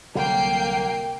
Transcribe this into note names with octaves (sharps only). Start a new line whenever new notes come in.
C2 D3 F#3 A#3 G5 C7